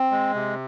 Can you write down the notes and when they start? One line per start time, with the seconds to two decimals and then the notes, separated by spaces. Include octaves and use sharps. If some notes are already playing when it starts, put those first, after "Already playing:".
Already playing: C4
0.11 G#3
0.34 C3